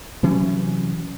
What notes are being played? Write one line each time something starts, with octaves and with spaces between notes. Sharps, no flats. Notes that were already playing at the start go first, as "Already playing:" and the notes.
C3 E3 F#3 C#4